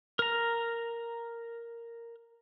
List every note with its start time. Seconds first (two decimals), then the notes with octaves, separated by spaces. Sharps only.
0.19 A#4 A#5